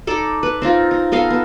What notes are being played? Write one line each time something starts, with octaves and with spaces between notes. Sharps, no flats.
D#4 A4 D5
B4
C4 D#4 F4
D#4
B3 A4 D#5 F5
B3